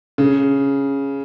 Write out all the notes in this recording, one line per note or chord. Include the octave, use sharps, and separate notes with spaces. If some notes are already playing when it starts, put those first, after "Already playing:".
C#3